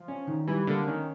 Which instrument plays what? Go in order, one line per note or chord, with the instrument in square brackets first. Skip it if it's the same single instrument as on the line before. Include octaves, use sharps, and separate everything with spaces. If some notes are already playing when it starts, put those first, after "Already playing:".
Already playing: [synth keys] F3
[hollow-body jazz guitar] C#4
D#3
[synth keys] E3 [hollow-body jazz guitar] G3
[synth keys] D3 [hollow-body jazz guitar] A#3
[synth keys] D#3 [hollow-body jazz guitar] C#4